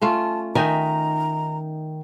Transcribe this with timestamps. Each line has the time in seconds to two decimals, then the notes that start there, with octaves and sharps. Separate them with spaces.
0.02 A3 C#4 F4 A5
0.55 D#3 D#4 E5 G5 G#5 A#5